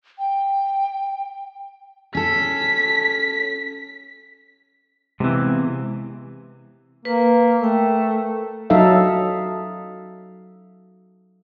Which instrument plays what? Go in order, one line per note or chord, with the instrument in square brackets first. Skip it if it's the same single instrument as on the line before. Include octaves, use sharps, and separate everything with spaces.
[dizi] G5
[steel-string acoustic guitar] C#4 A4 [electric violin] B6
[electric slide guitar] C3 E3 [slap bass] G#3 B3
[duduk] A#3 [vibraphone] B4
[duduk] A3 [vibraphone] A#4 G5
[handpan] F#3 D#4 A4 E5 F5